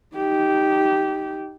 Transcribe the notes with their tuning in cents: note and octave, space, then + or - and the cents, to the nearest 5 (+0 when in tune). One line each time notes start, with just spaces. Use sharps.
D#4 +0 G4 -15